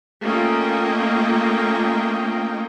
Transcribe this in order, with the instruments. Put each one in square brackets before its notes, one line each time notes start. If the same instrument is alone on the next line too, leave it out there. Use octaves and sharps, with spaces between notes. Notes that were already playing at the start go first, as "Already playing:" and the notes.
[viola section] A3 A#3 C#4 F4 D#5 G5